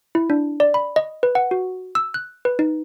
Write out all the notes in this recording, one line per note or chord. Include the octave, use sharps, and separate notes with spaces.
E4
D4
D5
B5
D#5
B4
F#5
F#4
E6
F#6
B4
D#4